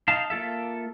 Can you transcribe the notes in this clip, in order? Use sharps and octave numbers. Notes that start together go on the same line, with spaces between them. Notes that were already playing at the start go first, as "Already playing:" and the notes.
D#4 F5 A5
A#3 F4 A4 E5